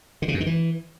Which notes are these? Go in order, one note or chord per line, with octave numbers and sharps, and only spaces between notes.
D3
C#3
F#2
D#3
E3